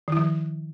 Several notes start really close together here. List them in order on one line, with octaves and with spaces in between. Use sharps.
D#3 E4 F3